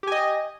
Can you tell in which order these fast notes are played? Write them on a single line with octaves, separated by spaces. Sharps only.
G4 G#5 D#5